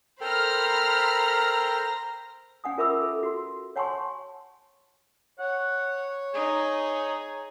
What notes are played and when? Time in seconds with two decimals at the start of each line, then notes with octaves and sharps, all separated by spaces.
0.21 A4 A#4 C5 G5 A#5 B5 F6
2.64 C#4 F#5 G#5 D#6
2.78 F4 A#4 E5 B5 D6 E6
3.02 A4
3.23 F#4 C6
3.76 C#5 F#5 G#5 A5 C6 C#6
5.39 C#5 F#5
6.34 D#4 G#4